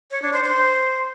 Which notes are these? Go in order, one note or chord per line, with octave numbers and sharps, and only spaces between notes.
C#5
D4
C5
C5